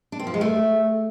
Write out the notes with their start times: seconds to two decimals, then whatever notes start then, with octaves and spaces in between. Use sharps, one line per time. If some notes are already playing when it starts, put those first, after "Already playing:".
0.12 D4
0.19 C4
0.27 F3
0.34 G#3
0.41 A3